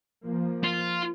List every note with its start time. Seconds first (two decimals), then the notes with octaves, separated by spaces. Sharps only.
0.25 F3 A#3
0.64 F4